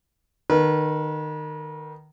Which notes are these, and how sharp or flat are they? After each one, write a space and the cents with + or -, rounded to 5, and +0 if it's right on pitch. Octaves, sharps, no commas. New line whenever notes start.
D#3 -25 B4 -40